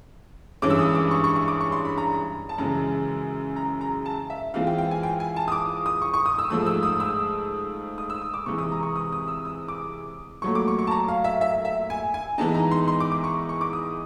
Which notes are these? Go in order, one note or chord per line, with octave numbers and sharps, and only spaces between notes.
G2 E3 G#3 C#4 D6
E6
D#6
D6
C#6
C#6
C#6
D6
C#6
C6
B5
A#5
A5
F#2 C#3 E3 G#3 A#5
A#5
A#5
A5
E5
E3 G#3 C4 F4 F5
G5
G5
G#5
G5
G#5
A5
D#6
D6
D#6
C#6
C#6
D#6
E6
G#2 F3 A3 D#6
E6
D#6
E6
D#6
E6
D#6
D6
C3 E3 G#3 C#6
D#6
A#5
C#6
D#6
D#6
E6
D#6
D6
A#2 F#3 A3 C#6
D6
C#6
C#6
A5
A#5
F5
E5
E5
E5
G#5
G#5
E3 G#3 B3 D#4 A5
A#5
C6
C6
D6
D6
C#6
C#6
D6
D#6